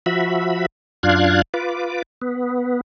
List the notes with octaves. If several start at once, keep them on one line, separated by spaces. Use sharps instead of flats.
F3 F#4 E5 B5
F#2 D4 F4 F5 F#6 G#6
F4 B4 D6
B3